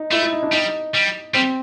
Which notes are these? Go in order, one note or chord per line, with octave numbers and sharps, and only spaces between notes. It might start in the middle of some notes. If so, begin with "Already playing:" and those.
Already playing: D#4
A3 E4
E4
D#4
D4
G3 D#4
G3
G3 C4